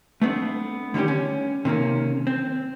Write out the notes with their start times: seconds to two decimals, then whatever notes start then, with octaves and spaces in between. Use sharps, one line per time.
0.22 A3 B3 C4 D4
0.94 D3 D#3 G3 C#4 G4
1.08 C#4
1.65 C3 D#3 A#3 C#4
2.27 C4